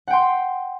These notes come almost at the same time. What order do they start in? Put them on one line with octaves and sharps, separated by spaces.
F#5 G5 C6